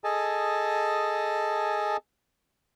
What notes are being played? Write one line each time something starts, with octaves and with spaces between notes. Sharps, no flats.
G#4 A4 D#5 G#5 A5